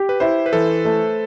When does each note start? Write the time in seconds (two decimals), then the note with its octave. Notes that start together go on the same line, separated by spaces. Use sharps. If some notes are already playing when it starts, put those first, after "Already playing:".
Already playing: G4
0.09 B4
0.20 E4 C5
0.46 B4
0.53 E3 A4
0.85 A3